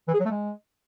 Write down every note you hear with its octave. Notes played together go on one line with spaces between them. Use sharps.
E3
G#4
F#3
A3
G#3